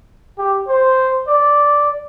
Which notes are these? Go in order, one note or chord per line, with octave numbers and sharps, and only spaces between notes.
G4
C5
D5